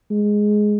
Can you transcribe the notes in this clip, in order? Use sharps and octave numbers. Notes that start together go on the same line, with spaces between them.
G#3